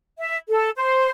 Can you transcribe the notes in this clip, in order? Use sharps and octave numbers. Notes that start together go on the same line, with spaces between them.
E5
A4
C5